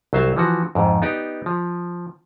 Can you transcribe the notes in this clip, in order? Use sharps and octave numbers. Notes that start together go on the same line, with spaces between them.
C2 F#3 C5 E5 F5
E3 F3 F#4
F2 G#2
B3 D#4 G4 D5
F3